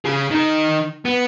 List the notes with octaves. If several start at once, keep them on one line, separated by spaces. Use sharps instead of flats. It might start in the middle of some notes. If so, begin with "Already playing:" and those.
C#3 G#4
D#3 D#4
B3